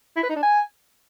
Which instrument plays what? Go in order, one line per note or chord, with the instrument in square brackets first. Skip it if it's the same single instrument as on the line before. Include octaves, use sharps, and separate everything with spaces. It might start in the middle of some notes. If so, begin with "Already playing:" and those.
[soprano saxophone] E4
B4
D#4
D4
G#5